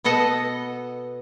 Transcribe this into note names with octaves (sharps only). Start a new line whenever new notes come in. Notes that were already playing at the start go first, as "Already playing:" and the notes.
B2 B3 A4 D#5 F#5